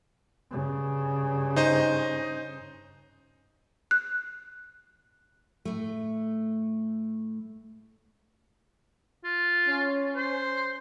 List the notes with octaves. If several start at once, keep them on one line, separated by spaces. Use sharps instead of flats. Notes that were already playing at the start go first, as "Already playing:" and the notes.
G2 C#3
D#4 C5 D#5
F#6
A2 A3
F4
C#4
C5